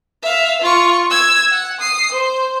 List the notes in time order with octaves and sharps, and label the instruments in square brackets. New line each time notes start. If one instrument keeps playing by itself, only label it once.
[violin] E5 F5
F4 C#6
E6 G#6
F#5
D#6 C7
C5